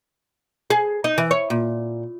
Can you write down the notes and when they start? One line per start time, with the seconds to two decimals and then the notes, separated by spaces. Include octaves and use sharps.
0.70 G#4
1.04 D#4
1.18 E3
1.31 C#5
1.50 A#2